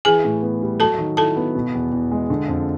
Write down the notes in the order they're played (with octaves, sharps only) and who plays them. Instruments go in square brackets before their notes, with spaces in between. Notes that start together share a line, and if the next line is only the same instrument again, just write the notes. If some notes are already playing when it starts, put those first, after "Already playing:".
[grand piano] E3 [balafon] G#4 G#5
[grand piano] A2
B3
G3
[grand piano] F#3 [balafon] A4 A5
[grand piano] D#3
[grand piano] E4 [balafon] A4 A5
[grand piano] B3
B2
E2
E2
G#3
D3
F2